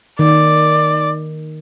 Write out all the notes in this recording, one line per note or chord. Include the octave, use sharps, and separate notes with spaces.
D#3 D5